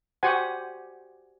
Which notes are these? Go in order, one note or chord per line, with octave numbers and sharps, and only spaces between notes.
F#4 G4 C5 F#5 G#5